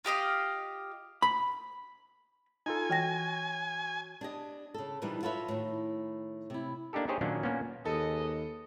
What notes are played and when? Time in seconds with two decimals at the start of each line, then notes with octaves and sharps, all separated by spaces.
0.05 F4 G4 D#5 F5
1.22 B5
2.66 D#4 F4 A4 G#5
2.90 E3 F#4 C#5 G5 A#6
4.21 D4 G4 D#5
4.74 C#3 A4
5.02 A#2 E3 F3 G3 D4 D#4
5.23 F4 F#4 A4 B4 C#5 E5
5.48 A2 D#3
6.50 C3 E4
6.93 A#3 D4 D#4 G4 A4
7.08 D#4 G4 G#4 C5 C#5 D#5
7.21 A#2 D#3 F#3 A#3 C#4 D4
7.43 A#2 A#3 B3 C#4
7.85 D#2 G#4 A4 B4 D#5